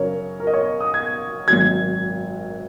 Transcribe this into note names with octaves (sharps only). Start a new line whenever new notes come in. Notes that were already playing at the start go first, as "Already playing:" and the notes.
Already playing: F#2 C#3 A#4 C#5
A#4
D#5
C#5
D#6
G#6
G#1 F#2 F#3 G#6